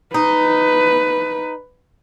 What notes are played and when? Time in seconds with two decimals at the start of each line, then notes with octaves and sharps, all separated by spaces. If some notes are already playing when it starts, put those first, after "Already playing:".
0.14 D#4 B4